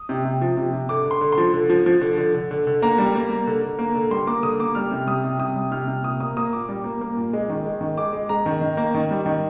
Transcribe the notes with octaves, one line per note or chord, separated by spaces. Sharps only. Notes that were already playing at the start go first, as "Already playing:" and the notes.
Already playing: D#6
C3
C3
F3
C3
C3
D3 D6
D3
C6
D3
C6
F3
D3
F3
F3
D3
D3
D3
D3
D3
A#3 A#5
G3
A#3
A#3
D3
D3
A#3
D3
G3 C6
A#3 D6
D3 D#6
A#3 D6
G3 F6
C3
G3 D#6
C3
C3 D#6
G3
C3 F6
C3
A#2 D#6
A#3 D#6
A#3 D#6
A#2 D6
G3
A#3
A#3
A#2
G#3
D#3
G#3
D#3
G#3 D6
G#3
G#3 A#5
D#3
D#3
A#3
D#3
G3
D#3